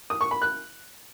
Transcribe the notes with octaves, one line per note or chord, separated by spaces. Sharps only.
D#6
C#6
B5
F#6